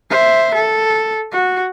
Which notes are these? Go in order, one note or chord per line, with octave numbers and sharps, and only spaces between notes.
C5 E5
A4
F#4